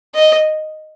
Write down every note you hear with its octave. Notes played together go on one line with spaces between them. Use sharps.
D#5